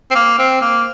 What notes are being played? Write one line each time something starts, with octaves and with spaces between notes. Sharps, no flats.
C4
A#3
C4
A#3